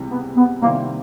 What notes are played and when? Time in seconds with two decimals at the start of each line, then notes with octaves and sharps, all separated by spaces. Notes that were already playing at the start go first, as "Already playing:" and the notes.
Already playing: C#2 C3 E3 G3
0.10 B3
0.36 B3
0.62 C3 D#3 G3 A#3 C4 E4